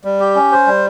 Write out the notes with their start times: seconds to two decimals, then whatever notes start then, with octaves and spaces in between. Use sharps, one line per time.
0.04 G3
0.20 G4
0.35 C#4
0.52 C5
0.67 G3